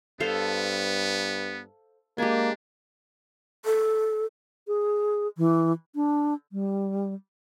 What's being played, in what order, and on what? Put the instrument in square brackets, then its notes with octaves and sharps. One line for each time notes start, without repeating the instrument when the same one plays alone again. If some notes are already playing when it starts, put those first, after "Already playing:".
[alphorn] G2 [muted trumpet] B3 [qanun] A4 C5 F5
[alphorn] G#3 [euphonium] A#3 [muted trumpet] D4 [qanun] G4 G#5
[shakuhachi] A4
[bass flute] G#4
E3
D4
G3